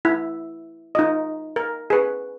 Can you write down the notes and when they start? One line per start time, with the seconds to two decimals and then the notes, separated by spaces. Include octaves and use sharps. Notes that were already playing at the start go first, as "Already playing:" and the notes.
0.05 E4
0.95 D#4 F4 D#5
1.56 A#4
1.90 G#4 B4